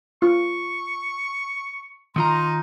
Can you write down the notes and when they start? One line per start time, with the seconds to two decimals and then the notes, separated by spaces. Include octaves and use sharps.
0.22 F4 C#6
2.16 D#3 D#4 F4 A#5 C6